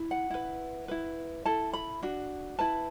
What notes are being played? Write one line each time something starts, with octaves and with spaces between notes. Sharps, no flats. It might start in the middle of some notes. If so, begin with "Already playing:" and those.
Already playing: E4
F#5
E4 B4
E4 B4
E4 A4 A5
B5
D4 F#4
E4 B4 A5